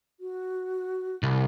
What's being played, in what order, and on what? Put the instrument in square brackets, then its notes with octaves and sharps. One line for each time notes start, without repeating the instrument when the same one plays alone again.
[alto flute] F#4
[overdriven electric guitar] C2